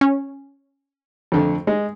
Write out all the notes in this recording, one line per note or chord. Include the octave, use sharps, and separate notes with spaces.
C#4
F2 D3 A3
G#3